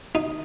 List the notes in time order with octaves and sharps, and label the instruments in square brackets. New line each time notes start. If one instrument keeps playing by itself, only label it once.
[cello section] D#3 [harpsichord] D#4